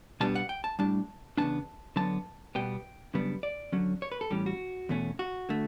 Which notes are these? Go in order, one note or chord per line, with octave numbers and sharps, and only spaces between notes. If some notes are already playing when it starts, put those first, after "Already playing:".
B2 G3 B3 D4 A5
F#5
G5
A5
A2 G3 D4 A5
E2 C#3 E3 B3 D4 A5
D3 F#3 B3 D4 A5
B2 G3 B3 G5
F#2 C#3 G3 B3 D4
D5
D3 F#3 C#4
C#5
B4
A4
A2 E3 G3 C#4 G4
F#4
E2 B2 A3 C#4
F#4
D3 A3